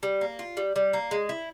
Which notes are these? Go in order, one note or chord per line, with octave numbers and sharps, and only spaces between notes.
G3
A#3
F4
G3
G3
A#3
G#3
E4